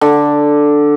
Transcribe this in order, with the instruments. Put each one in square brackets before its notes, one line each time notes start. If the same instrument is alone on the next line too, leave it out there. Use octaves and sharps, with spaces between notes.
[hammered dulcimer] D3